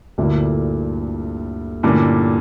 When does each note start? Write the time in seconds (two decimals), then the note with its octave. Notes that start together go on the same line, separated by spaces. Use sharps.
0.18 D2 G2 A#2 D3 A3 E4 A#4
1.83 G2 A#2 D3 A3 C#4 E4 A#4